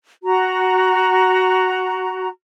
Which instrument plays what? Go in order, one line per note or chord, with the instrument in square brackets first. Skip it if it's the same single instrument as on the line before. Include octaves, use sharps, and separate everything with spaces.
[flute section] F#4 A#5